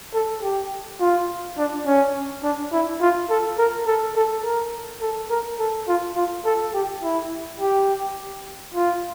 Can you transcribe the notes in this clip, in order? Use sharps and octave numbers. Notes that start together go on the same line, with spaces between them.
A4
G4
F4
D4
C#4
D4
E4
F4
A4
A#4
A4
A4
A#4
A4
A#4
A4
F4
F4
A4
G4
E4
G4
F4